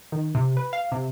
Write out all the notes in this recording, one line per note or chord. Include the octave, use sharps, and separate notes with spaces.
D#3
C3
B4
F5
C3